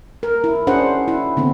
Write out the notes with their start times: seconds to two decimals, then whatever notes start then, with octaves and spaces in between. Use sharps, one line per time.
0.23 A#4
0.44 E4
0.67 C#4 D4 G#4 C5 F#5
1.08 E4
1.37 D3 B3 C4